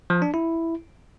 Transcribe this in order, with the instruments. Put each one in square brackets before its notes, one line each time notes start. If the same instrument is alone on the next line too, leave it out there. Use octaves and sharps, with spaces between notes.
[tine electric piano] F3
D4
E4